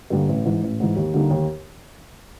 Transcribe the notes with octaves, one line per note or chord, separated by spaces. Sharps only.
G2 D3 G3 A#3
A1
G#2 E3
A1
G#2 E3
D#2
D3 G3 A#3 D#4
D#2